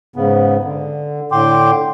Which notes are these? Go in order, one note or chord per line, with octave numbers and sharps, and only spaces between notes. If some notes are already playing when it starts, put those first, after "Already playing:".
G#2 C#3 B3
D3
A2 D3 G5 C6 D6